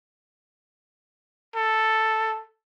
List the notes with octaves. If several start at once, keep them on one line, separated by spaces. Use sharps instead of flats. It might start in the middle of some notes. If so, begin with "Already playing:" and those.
A4